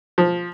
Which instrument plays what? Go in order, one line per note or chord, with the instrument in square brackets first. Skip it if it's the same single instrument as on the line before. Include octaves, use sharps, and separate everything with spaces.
[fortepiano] F3